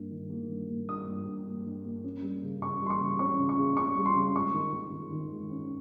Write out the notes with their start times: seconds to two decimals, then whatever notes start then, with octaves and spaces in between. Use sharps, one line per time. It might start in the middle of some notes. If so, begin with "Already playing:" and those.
Already playing: G2 A#3
0.11 D#3
0.30 A#3
0.50 G2
0.70 A#3
0.88 G2 D#6
1.07 G2
1.26 G2
1.46 A#3
1.66 G2
1.85 A#3
2.04 C#4
2.23 G3
2.43 C#3
2.61 C#3 C#6
2.81 G3 C6
2.90 C#6
3.01 C#3
3.19 C#4 C#6
3.39 C#3
3.49 C#6
3.57 C#3
3.77 C#4 C#6
3.97 G3
4.06 C6
4.15 C#3
4.35 G#3 C#6
4.54 D#3
4.73 D#3
4.93 D#3
5.12 D#3
5.31 G#3
5.51 C#4